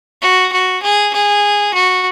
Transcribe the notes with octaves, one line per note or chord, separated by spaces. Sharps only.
F#4
F#4
G#4
G#4
F#4